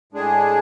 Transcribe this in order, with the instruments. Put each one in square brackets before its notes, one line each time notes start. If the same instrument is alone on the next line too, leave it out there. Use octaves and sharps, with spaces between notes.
[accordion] A2 G#3 D4 G#4